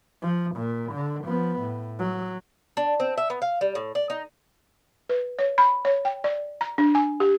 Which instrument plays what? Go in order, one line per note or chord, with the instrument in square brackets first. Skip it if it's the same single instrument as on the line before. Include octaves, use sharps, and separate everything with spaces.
[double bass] F3
A#2
D3
F3 B3
A2
F#3
[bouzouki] D4
C4
E5
B3
F5
G3
A2
D5
D#4
[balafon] B4
C#5
B5
C#5
G5
D5
A#5
D4
G#5
G4